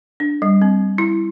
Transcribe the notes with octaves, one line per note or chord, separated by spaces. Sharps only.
D4
G3
C4
E4